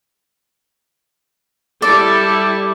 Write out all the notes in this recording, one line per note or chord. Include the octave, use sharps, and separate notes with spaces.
G3 E4 A4 D5